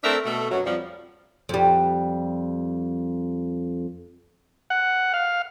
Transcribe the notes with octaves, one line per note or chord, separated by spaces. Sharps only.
A3 C4 D4 A#4 E5
B2 A3
F#2 B2 F#3
F2 F3 G3
F2 G3
F#5
F5